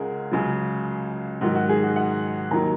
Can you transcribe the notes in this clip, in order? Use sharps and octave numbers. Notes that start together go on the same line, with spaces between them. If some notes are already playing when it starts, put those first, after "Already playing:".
Already playing: C#2 C#3 G#3 G#4 A#4 F#5
C#2 C#3 F#3
G#2 D#3 F#3 F#4
F#4
G#4
F#4
F#5
D#2 D#3 F#3 A#5